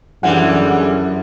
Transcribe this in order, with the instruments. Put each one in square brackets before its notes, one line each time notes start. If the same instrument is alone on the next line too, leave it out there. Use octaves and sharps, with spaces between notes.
[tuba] F#2 [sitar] D3 E3 G3 [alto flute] G#4 [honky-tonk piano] F#5